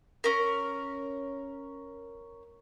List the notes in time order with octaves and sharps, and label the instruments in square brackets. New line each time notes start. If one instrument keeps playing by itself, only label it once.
[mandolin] C#4 A#4